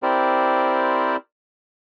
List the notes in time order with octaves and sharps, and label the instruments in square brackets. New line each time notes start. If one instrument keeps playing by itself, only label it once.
[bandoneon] C4 E4 G4 A#4 C5 D5